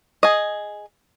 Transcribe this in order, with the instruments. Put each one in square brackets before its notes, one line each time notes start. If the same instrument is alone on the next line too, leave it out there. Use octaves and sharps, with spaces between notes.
[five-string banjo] G#4 D#5